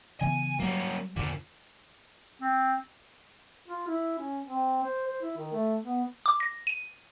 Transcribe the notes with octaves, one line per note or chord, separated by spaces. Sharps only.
C#3 E3 B3 G#5
F#3 G3 A#3 C#4
E2 A#2 D3 F3
C4
F4
E4
C#4
C4
C5
C5
E4
D#3
A3
B3
D6
A#6
D#7